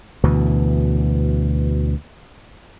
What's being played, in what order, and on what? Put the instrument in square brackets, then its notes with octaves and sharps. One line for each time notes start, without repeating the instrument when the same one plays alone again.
[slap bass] D2 B2 E3